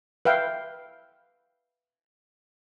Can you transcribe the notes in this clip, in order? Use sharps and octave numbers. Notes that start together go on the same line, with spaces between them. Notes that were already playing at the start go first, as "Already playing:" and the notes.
B4 E5 F5 G5